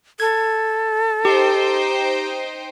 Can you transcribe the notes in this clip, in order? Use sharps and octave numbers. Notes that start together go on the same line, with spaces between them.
A4 G#6
D#4 G4 C5 G5